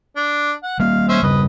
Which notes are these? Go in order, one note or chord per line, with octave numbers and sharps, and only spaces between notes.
D4
F#5
G3 A#3 F5
C#4 C5 E5
G2 C#3 G3 B4 D#5